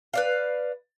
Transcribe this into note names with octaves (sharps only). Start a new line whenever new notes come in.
B4 D5 F5